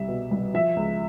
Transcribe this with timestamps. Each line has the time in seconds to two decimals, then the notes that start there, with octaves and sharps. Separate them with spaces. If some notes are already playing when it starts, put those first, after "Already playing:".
Already playing: C2 G3 E5
0.08 B2
0.31 C2
0.54 F3 E5
0.76 C#2